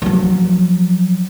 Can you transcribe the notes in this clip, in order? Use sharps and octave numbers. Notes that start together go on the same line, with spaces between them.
F3 F#3